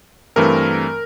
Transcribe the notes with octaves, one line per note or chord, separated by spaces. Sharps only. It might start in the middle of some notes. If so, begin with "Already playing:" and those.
G2 E3 A3 C4 A#4